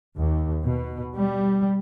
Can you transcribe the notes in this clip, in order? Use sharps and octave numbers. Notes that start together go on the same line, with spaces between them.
D#2
B2
G3